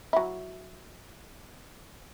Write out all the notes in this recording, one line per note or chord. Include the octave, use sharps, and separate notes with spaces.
F#3 E4